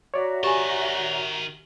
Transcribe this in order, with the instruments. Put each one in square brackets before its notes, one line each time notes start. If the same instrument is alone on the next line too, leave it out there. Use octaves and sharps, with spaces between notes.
[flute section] F#4 E5 A#5 [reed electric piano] C#5 D5
[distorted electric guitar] D#3 A5 [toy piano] G4 G#5